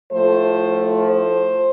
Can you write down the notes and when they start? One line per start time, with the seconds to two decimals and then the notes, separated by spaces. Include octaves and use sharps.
0.12 A2 F3 A3 C5
0.99 C5